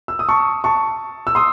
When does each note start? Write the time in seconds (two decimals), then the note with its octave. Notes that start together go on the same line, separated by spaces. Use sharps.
0.08 E6
0.19 D#6
0.29 A5 C#6
0.64 A5 C#6
1.27 E6
1.35 C6 D#6